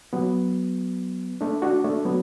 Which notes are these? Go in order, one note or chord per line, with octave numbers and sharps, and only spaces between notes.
F#3 B3
A3 D4
D4 F#4
A3 D4
F#3 B3